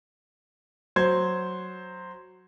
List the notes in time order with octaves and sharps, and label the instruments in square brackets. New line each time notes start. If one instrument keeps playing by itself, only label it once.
[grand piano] F#3 C5 G#6